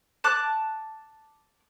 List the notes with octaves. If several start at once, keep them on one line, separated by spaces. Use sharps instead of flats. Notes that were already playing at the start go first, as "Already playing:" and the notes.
A5 D6 F#6